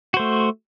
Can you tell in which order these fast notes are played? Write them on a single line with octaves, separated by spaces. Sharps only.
F#4 C5 A3